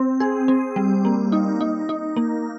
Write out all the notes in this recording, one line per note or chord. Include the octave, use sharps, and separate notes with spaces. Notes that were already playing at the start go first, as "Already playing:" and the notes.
Already playing: C4
G#4
C4
G3
A#3
D#4
D#4
D#4
A#3